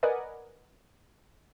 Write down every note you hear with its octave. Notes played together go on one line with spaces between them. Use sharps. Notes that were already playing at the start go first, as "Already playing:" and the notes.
A#4 B4 D5 D#5 F#5 G#5